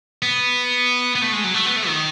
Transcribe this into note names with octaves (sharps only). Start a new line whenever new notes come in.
B3
B3
A3
G#3
F#3
A3
B3
A3
D#3